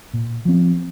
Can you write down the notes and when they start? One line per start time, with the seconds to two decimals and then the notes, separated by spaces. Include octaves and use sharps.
0.14 A#2
0.45 F3 C4